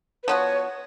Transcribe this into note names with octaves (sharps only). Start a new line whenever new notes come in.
B4
F3 B3 F#4 C#5